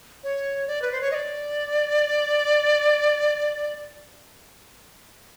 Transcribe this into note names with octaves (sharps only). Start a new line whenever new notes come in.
C#5
D5
B4
C5
C#5
D#5
D5